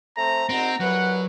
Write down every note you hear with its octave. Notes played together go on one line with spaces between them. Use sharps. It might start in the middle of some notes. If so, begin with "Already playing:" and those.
A3 C4 A#5
A#1 C4 D#4 F#4 A#5
C2 F#3 B4 F#5